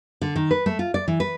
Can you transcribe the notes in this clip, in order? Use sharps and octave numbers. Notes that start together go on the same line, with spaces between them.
D3
D#3
B4
A3
F4
D5
E3
B4